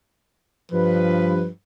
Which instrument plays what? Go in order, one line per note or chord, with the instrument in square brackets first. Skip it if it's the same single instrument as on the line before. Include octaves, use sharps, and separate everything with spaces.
[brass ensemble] G2 B4 [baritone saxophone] F3